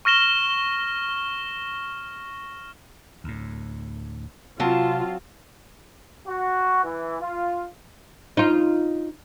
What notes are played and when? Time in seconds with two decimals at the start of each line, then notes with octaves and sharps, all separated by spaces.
0.05 C#6 F6 A#6 E7 G7
3.24 D2 A2
4.60 C3 F#3 C4 F4 A5
6.27 F#4
6.84 E3
7.21 F4
8.37 D#4 F4